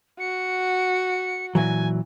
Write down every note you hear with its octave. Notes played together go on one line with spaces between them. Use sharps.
F#4 C#7
A#2 E3 F#3 G#5